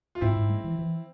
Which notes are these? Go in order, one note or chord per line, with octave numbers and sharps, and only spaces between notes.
F4
G#2 C4 E4
G#2
G#3
E3
E3